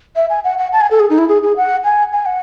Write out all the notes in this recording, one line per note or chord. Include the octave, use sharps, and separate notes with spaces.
E5
G#5
F#5
F#5
A5
G#5
A4
G#4
D#4
E4
G#4
G#4
F#5
G#5
G#5
F#5